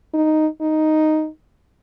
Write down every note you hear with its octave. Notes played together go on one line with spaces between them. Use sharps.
D#4
D#4